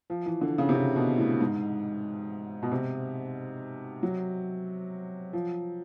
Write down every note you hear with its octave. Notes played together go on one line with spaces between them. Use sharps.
F3
E3
D3
C#3
C3
C#3
B2
A2
G#2
B2
C3
F#3
F3